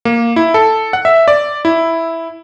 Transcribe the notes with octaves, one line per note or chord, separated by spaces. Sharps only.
A#3
E4
A4
F#5
E5
D5
E4